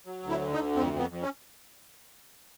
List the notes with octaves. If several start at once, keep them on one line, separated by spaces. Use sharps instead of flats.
F#3
D2
E4
D3
D#4
D2
F2 C4
F2
B3
F2
C#4